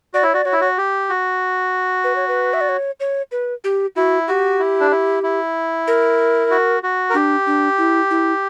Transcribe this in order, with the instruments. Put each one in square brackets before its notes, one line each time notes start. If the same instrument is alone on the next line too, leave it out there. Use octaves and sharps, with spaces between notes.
[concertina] F#4 [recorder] D5
[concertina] E4 [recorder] C#5
[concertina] F#4 [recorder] D5
[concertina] F#4 [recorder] C#5
[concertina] E4
F#4
G4
F#4
[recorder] B4
C#5
B4
E5
D5
C#5
C#5
B4
G4
[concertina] E4 [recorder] F#4
[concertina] F#4 [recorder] G4
[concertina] E4
D4
E4
E4
[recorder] A#4
[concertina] F#4
F#4
A#4
[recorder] D4 [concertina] G4
[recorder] D4
E4
E4